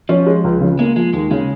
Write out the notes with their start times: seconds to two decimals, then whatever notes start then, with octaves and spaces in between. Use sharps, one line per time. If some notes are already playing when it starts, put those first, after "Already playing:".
0.09 F3 C#4
0.26 G#3
0.44 C#2
0.61 C#3
0.79 G#3 A#3
0.96 F3 G#3
1.13 D#2 G#3
1.31 C#3 G#3